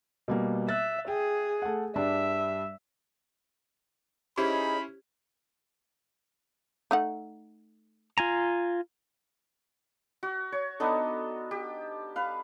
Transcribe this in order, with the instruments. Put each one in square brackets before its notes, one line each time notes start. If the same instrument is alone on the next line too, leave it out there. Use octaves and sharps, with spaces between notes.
[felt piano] B2 G3 A#3
[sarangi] E5 [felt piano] F#6 A6
[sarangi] G#4 [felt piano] G5
[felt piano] A3 F#5
[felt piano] G2 G3 D4 [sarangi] E5
[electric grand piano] C#4 E4 C5 [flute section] D#4 G#4 C#5 [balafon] G4 [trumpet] B5
[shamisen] A3 D#4 F#5
[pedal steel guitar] F4 G#5 A#5
[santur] F#4
C#5
B3 D4 D#4 A4
G4
B4 F5